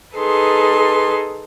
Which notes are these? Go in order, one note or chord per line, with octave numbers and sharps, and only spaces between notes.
D#4 G#4 A4 B4 C6